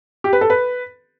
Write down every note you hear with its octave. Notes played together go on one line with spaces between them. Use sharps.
G4
B4
A4
B4